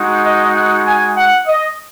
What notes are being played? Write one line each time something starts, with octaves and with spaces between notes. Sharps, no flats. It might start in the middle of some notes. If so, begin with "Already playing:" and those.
Already playing: G#3 D#4 F#4
D#5
F#5
G#5
F#5
D#5